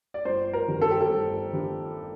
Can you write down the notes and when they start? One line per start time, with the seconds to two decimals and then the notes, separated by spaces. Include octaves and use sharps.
0.14 D5
0.25 G1 C5
0.53 A#4
0.68 G2 D#3 G3
0.81 A4
0.91 G4
1.01 A4
1.10 G1
1.53 G2 D#3 G3